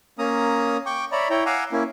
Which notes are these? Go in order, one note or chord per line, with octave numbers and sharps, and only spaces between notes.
A#3 C#4 A#5 D#6
G5 C#6 D6
C#5 D5 E5 A#5 B5
E4 C#5 G5 A#5
F5 F#5 G#5 A#5 D6 E6
A#3 C#4 E4